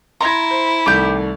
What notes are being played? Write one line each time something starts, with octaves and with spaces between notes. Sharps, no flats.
E4 A#5 C6 G#6
C5
C2 D#3 A3 G4 G6